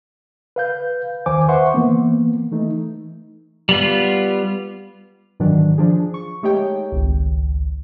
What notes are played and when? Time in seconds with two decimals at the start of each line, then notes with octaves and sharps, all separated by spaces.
0.56 B4 F5 G6
1.26 D#2 D#3 C5 G#5 D6
1.48 B4 C5 E5 F#5 C6 C#6
1.74 E3 A#3 B3
2.52 E3 A3 D#4
3.69 G3 B3 F4
5.40 G#2 D#3 E3 F#3 D4
5.78 F3 D4 G#4
6.14 C#6
6.43 G#3 A3 D#4 G4 C#5 G5
6.92 G#1 C#2